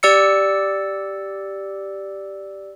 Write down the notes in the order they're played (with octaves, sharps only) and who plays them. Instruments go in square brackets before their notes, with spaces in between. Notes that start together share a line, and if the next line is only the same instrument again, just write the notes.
[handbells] G4 D5 E6 C#7